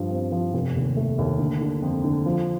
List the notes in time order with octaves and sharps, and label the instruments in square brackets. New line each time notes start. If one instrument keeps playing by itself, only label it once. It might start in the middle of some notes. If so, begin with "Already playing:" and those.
Already playing: [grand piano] G2 F3
C4
F3
F1
D#2
A3
D#2
D3
D3
F2
D3
F3